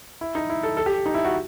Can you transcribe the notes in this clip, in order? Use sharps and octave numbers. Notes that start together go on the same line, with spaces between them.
E4
D#4
E4
A4
A4
G4
D#4
E4
F#4